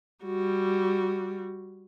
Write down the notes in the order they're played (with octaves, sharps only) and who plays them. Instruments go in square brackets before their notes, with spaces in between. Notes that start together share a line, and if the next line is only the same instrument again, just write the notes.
[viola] G3 F#4